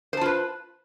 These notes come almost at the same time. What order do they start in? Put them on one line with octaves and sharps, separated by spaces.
C5 A5 F4 B4